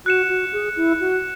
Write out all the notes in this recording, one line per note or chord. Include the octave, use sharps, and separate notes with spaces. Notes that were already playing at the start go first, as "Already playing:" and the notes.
F#4 F#6 C#7 E7
F#4
G#4
E4
F#4